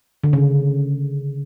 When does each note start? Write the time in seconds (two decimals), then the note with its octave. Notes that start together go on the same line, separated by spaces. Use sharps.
0.24 D3
0.33 C#3